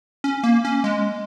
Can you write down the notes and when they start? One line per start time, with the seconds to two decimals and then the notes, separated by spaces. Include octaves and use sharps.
0.24 C#4
0.43 A#3
0.65 C#4
0.84 G#3